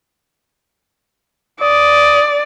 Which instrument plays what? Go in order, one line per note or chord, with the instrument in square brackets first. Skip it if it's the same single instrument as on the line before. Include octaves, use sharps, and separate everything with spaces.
[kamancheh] D5 [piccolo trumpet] D#6